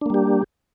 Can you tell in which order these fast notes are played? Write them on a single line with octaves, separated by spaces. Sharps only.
D4 A#3 G3 G4